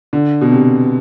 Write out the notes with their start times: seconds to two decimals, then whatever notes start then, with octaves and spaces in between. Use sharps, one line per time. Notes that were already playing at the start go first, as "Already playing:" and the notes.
0.13 D3
0.41 B2
0.52 C3